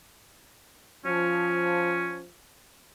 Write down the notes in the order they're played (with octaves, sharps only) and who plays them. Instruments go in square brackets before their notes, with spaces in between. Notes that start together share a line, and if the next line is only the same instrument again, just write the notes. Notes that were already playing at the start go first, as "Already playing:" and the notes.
[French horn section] F3 [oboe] C#4